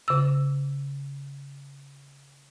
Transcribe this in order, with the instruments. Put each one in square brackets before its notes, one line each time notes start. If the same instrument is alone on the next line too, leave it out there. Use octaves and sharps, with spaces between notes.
[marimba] C#3 E6